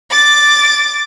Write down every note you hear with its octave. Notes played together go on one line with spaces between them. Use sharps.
D6 A6